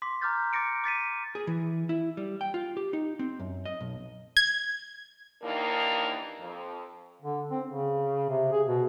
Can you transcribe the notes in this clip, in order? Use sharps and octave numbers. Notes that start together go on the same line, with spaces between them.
C6 D6 B6
A#5 D6 F6 G6 A6
D6 A6 A#6 C#7 D7
D6 A6 B6 D#7
G#4
E3
E4
G3
G5
F4
G4
D#4
C4
F#2
D#5
B1
G#6
D#2 E3 A#3 D4 D#4 A#4
F2
D3
C4
C#3
C3
G#4
B2